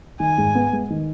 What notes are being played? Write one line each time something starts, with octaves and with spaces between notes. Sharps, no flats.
D#3 G#5
G#2
B3
G#3
D#3